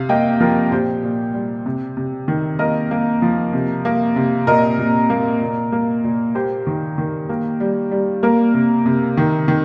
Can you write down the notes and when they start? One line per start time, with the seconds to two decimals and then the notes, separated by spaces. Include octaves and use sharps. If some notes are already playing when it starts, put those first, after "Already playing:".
Already playing: C3 F5
0.09 A#3 D#5 G5
0.40 F3 A#4
0.71 A#2 G4 C5
1.03 A#2
1.34 G3
1.66 C3
1.97 C3
2.28 D#3
2.59 A#3 A#4 D#5
2.91 A#3
3.22 F3
3.53 C3
3.85 A#3
4.16 C3
4.47 A#2 A#4 D#5
4.78 A#2
5.10 A#3
5.41 A#2
5.72 A#3
6.04 A#2
6.35 A#3 G4 C5
6.67 D#3
6.98 D#3
7.29 A#3
7.60 G3
7.91 G3
8.23 A#3 A#4
8.54 C3
8.86 C3
9.17 D#3
9.48 D#3